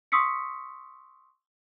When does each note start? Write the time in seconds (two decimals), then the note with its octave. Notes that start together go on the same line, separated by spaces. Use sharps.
0.12 C6 C#6 D#6 E6 B6 C#7